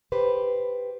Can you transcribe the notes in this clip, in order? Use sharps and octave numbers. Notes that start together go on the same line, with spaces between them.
G4 B4 C5